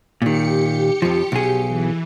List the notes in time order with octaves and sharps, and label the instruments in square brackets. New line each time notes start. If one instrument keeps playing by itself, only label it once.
[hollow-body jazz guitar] A#2 D#3 [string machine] G4 C#7
[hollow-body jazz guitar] F2 F3
B1 G#4
[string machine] E3